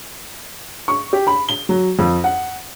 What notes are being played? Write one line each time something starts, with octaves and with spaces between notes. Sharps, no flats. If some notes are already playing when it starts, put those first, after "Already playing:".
C#6
G4
B5
G7
F#3
F2
F#5